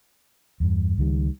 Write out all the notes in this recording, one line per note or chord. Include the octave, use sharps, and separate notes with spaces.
E2 G2
C#2 D#3 G3